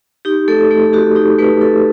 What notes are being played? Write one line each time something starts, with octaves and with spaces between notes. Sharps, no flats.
D#4 G4
A3 A4
A3
F#4 G4
D#4 G4
A3 B4
D#4 A4